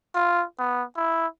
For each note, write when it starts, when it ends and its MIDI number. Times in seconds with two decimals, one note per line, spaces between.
0.14 0.44 65
0.59 0.83 59
0.97 1.27 64